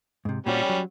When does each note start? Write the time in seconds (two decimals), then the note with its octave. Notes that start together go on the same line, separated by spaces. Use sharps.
0.25 G#2 C3
0.46 A#2 G3 C4 C#4 F#4
0.69 F#3